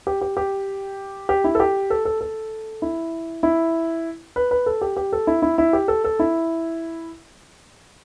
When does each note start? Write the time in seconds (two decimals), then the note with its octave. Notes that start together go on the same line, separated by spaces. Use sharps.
0.07 G4
0.21 G4
0.37 G4
1.29 G4
1.44 E4
1.55 A4
1.60 G4
1.90 A4
2.05 A4
2.21 A4
2.82 E4
3.43 E4
4.36 B4
4.51 B4
4.66 A4
4.81 G4
4.97 G4
5.13 A4
5.27 E4
5.42 E4
5.58 E4
5.73 G4
5.88 A4
6.04 A4
6.19 E4